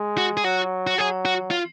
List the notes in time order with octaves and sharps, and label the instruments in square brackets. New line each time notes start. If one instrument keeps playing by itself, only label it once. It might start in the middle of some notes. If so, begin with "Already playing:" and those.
Already playing: [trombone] G#3
[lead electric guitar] F#4
G#4
[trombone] F#3 [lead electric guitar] F#4
[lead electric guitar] F#4
[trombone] F#3 [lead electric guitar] G#4
[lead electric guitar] F#4
F4